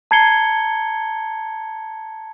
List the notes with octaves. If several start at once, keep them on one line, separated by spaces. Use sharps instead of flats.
A5 A#5 G#6 C7 C#7 G7